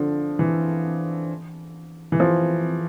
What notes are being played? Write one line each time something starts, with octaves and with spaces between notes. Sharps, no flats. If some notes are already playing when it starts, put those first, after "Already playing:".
Already playing: D3 F3
E3
E3
F3